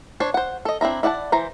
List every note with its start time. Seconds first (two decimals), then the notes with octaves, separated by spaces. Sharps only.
0.20 D4 C5 C#5
0.34 C5 F#5
0.65 A4 D#5
0.81 C4 D4 E4 A#5
1.03 E4 D5 F#5 G#5 A5
1.32 E3 C5 A#5